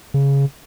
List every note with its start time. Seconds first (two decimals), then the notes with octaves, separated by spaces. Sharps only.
0.14 C#3